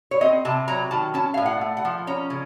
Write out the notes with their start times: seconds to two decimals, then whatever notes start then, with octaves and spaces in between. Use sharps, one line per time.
0.11 C#5
0.21 C4 D#5
0.45 C3 A5
0.68 F#3 A#5
0.91 D#3 A5
1.14 C#4 A5
1.34 A2 F5
1.46 F#5
1.61 A3
1.77 F#5
1.85 F3
2.07 C#4 A#5
2.30 C#3